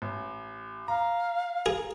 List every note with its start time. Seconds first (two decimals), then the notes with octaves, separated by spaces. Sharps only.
0.02 A1
0.88 F5 A#5
1.66 G#4